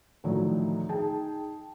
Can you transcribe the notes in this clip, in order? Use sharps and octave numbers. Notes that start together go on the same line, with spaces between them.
A2 D3 D#3 F3 F#3
D#4 G#4 G5 A5